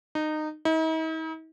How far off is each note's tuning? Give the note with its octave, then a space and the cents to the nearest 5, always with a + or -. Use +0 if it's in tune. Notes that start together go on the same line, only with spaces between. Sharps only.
D#4 -20
D#4 +45